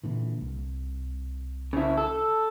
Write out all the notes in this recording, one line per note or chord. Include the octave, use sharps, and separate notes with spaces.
A#2 D3 E3
C2
C#3 E4
A4